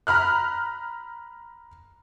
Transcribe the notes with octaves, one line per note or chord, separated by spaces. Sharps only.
A#5 B5 F6 F#6